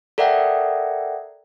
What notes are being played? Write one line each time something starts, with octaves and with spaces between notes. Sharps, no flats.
A4 A#4 D5 E5 F#5 G5